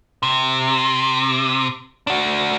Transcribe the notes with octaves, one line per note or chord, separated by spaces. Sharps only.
C3
D4 F#4